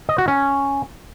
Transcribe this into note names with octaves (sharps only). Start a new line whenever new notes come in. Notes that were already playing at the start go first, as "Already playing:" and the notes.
D#5
F#4
C#4